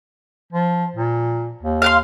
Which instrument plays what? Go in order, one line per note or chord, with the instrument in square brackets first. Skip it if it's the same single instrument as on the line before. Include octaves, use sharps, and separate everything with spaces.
[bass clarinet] F3
A#2
D#2
[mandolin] F5 F#5 C6